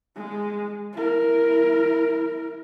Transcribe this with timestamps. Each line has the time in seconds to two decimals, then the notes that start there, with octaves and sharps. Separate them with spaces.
0.16 G#3
0.93 E4 A#4